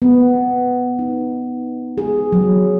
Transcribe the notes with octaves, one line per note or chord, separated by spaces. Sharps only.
B3
D#4
G#4
F#3